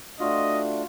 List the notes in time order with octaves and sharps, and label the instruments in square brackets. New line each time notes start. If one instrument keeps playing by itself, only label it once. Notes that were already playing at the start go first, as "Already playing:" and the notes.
[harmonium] A3 D4 [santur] F4 F#4 F#5 [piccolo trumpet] D#5